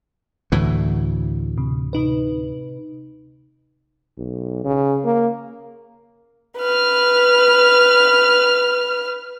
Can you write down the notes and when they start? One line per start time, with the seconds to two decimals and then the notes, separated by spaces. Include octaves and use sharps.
0.52 D2 A2 E3
1.58 C3
1.93 C3 D#4 B4
4.18 B1
4.64 C#3
5.04 A#3
6.59 B4 F6